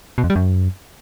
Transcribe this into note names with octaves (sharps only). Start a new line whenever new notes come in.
B2
F2
G3
F#2